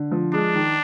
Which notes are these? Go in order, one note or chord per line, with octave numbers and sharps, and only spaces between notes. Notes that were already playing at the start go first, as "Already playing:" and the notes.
Already playing: D3
F3
G#3 D4
D#3